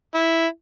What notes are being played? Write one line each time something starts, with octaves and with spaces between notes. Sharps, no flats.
E4